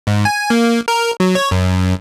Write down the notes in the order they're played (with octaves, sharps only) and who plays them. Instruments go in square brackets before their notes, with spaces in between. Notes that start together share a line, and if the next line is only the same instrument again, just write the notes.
[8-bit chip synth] G#2
G#5
A#3
A#4
F#3
C#5
F#2